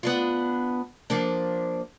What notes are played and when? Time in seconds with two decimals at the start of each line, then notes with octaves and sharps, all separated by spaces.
0.03 B3 D4 F4
1.10 F3 A#3 D4